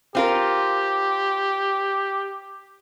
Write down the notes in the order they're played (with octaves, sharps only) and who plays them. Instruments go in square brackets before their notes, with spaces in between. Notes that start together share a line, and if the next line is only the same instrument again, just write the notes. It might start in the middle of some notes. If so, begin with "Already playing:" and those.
[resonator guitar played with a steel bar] C4 F4 A#4 [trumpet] G4